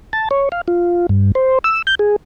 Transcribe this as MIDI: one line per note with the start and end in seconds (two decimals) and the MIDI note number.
0.13 0.29 81
0.31 0.49 73
0.52 0.61 77
0.68 1.07 65
1.09 1.32 43
1.35 1.59 72
1.64 1.82 88
1.87 1.95 91
1.99 2.16 68